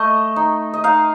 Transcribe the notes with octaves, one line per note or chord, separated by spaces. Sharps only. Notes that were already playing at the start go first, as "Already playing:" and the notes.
Already playing: A3 D#5
D#4
D#5
D#4 F5